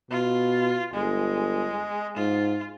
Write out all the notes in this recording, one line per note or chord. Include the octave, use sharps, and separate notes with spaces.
B2 F4
G1 G#3
G#2 F4